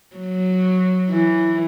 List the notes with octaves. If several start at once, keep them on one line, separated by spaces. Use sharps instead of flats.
F#3
E3